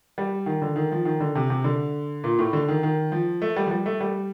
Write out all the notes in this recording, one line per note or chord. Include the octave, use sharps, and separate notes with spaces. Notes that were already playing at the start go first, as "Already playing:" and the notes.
G3
D#3
D3
D#3
F3
D#3
D3
C3
C3
D3
A#2
A2
D3
D#3
D#3
F3
A3
G3
F3
G3
A3
G3